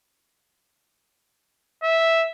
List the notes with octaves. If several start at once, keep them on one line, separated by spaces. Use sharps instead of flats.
E5